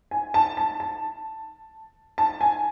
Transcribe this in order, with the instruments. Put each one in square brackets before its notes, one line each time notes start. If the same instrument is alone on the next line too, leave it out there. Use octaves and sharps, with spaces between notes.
[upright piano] G#5
A5
A5
A5
A5
G#5